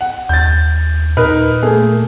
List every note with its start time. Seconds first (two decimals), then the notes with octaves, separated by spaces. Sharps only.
0.01 F#5
0.29 D#2 G6 A6
1.17 A#2 D#4 A#4 B4
1.63 A3 A#3 G#4